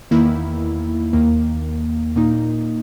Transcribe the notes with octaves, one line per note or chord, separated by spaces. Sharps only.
E2 D#3 A#3 E4
D#2 D#3 A#3
A#2 A#3 D#4